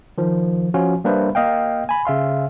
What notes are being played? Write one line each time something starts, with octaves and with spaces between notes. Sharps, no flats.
D#3 F3
F3 C#4 F4 F#4
G3 A#3 D4 B4 C5 E5
A#3 D#5 F5 G5
G#5 B5
C#3 E5 F5 C6